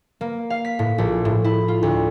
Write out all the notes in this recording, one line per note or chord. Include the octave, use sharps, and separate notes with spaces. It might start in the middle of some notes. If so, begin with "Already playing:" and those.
A#3
F5
B6
A2
A#1
A2
E4
F4
D2